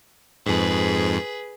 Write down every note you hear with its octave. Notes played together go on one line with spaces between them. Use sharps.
F2 G#2 G#4 B4